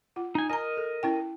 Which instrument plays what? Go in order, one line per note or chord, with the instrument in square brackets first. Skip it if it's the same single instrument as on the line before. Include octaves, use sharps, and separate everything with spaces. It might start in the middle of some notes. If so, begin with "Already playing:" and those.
[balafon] F4 F#5
[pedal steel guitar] D#4 G#5
[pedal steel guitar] A#4 D#5 [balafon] G#5 A#5
[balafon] A4
C#4 E4 G5